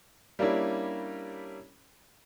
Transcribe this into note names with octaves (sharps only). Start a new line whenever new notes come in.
G3 A#3 C#4 D4 E4